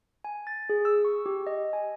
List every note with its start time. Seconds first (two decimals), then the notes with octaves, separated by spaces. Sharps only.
0.24 G#5
0.47 A6
0.69 G#4
0.85 E6
1.05 C#6
1.26 G4
1.47 D#5
1.73 G#5